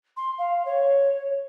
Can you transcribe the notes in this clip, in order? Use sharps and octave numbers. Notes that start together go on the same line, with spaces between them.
C6
F5
C#5